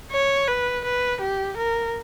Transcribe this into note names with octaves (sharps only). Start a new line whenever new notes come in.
C#5
B4
B4
G4
A#4